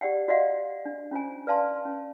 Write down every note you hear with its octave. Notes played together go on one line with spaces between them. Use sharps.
G4 D5 F#5 G5
F#4 D5 D#5 F5 F#5
D4
C#4 F4 C5 G#5
B4 D5 F5 A5 C6
C#4